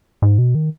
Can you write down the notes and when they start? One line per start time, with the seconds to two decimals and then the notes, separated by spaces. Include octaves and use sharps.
0.22 G#2
0.38 B2
0.55 D#3